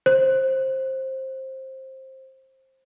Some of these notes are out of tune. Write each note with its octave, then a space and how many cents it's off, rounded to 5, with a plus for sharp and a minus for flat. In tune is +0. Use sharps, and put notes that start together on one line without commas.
C5 +15